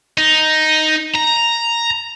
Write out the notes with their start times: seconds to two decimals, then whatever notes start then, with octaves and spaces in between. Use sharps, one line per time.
0.18 D#4
1.14 A#5